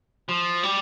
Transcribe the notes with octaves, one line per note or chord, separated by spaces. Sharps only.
F3
G3